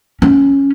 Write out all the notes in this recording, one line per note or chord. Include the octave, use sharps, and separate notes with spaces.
C#4